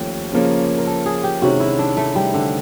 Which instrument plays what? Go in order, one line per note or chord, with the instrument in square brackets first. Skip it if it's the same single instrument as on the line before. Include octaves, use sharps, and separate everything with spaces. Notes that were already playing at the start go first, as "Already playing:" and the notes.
Already playing: [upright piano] D#2 F3 A3 C#4 [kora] G4
[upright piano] C#3 F3 A#3 C#4
[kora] A#4
A4
G#4
G4
[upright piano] C3 D#3 G#3 C#4 [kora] F#4
[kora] E4
D4
A3
G3
D3